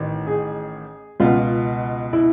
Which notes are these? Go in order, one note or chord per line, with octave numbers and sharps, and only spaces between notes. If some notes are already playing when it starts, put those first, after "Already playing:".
Already playing: A1 D#3
G#4
C#2 B2 F4
E4